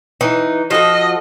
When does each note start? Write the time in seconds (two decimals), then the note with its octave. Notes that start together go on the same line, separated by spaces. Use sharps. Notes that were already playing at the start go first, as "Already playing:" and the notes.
0.21 E3 D#4
0.71 F3 F#4 A4 D#5